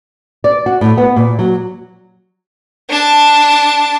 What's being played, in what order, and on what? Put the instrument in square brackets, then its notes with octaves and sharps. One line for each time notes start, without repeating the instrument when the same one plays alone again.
[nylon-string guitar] D5
F#4
A2
B3
A#2
F#3
[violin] D4 A5